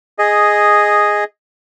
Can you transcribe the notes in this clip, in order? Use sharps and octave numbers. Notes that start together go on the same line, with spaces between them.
G#4 D#5